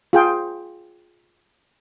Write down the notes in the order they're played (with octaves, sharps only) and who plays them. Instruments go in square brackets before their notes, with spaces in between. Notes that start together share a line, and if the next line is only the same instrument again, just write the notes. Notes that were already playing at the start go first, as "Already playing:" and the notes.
[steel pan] F4 G#4 G5